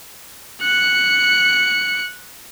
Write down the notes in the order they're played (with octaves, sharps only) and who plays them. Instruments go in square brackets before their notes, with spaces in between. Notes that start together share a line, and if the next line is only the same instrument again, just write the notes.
[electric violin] F#6 C#7